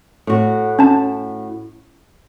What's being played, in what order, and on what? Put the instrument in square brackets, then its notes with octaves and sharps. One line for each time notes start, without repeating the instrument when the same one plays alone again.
[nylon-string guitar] A2 F#4
[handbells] C#4 A5